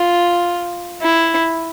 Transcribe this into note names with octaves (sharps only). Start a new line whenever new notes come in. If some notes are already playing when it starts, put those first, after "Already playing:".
Already playing: F4
E4